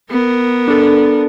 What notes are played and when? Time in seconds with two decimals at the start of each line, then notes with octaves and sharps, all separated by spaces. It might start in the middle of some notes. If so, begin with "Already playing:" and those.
0.10 B3 A#4
0.68 D4 A4